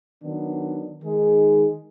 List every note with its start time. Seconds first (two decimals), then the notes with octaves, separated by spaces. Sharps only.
0.23 D#3 F#3 B3 D4
1.02 D#3 G#3 D#4 G#4